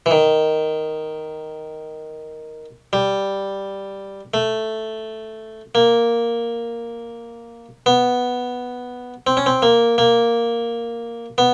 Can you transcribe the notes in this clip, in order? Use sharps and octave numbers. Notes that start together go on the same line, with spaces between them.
E3
D#3
G3
A3
A#3
B3
C4
C#4
C4
A#3
A#3
B3